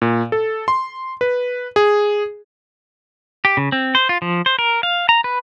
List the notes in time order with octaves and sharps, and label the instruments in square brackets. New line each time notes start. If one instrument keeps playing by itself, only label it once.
[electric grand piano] A#2
A4
C6
B4
G#4
[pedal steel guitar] G4
C#3
C4
C5
F4
F3
C5
A#4
F5
A#5
B4